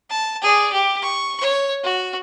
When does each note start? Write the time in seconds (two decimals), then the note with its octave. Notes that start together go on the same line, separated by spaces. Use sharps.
0.10 A5
0.42 G#4 D5
0.73 G4
1.02 C#6
1.41 C#5
1.84 F#4